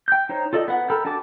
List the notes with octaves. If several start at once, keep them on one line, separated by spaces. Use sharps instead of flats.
G5 G6
D#4 C5 C#5
F4 A4 D5 D#5
B3 F#5
A4 A#4 G5 B5
D4 F#4 G#5 A5 D6